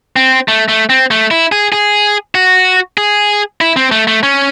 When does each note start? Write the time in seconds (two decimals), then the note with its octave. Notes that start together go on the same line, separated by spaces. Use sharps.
0.16 C4
0.48 A3
0.69 A3
0.90 C4
1.11 A3
1.31 E4
1.52 G#4
1.72 G#4
2.35 F#4
2.97 G#4
3.61 E4
3.76 C4
3.92 A3
4.07 A3
4.23 C#4